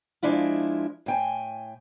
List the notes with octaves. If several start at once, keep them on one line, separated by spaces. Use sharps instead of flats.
F3 G#3 D4 E4 F4
A2 G5 G#5